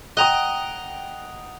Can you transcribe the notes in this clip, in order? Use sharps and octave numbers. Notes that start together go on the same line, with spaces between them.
D#5 F#5 G5 A#5 D#6